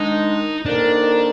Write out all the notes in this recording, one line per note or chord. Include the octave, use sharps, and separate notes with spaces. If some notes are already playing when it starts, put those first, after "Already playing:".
Already playing: D#3 G#3 D4 D#4
F2 D#3 A#3 D4 D#4 A#4